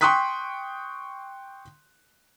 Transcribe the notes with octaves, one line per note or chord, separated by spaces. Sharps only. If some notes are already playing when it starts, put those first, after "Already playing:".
G5 C6 C#6 D#6 F#6 B6